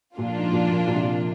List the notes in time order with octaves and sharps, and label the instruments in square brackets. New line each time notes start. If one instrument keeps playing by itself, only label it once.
[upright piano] A#2 [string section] F3 A#3 D4 F4
[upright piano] G#2
A#2
A#2
A#2
C3
A#2